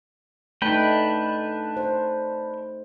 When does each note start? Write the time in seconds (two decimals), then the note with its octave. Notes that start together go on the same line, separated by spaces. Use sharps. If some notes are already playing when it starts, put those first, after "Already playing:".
0.62 A3 D4 D#4 B4 G5
1.77 C5